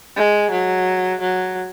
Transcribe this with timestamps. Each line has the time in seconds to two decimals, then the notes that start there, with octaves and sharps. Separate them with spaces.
0.16 G#3
0.51 F#3
1.21 F#3